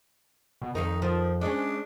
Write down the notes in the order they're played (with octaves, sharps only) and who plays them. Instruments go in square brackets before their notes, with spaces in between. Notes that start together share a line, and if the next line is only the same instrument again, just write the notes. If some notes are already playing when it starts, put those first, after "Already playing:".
[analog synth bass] B2
[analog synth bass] F2 [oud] D#3 A#4 [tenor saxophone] D#4
[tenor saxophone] D#3 [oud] F3
[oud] G#3 C#4 [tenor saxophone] D4